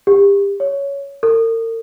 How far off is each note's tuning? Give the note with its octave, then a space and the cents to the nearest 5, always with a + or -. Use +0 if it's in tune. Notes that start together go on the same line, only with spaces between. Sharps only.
G4 +35
C#5 +10
A#4 -40